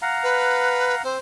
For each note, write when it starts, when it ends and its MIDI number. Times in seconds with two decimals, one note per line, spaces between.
0.02 1.02 77
0.02 1.02 78
0.02 1.02 82
0.23 0.95 71
1.04 1.17 60
1.04 1.19 72